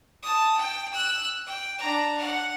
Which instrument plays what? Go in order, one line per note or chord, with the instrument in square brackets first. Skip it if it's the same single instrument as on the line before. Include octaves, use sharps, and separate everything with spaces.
[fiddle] A5 D#6
G5
E6 F#6
G5
D4 A#5
F#5